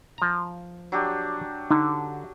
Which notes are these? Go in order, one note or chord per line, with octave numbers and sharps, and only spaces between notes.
F3 A#5
F#3 D4 G4
D3 D#4